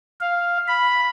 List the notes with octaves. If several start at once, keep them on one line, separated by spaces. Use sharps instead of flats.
F5
B5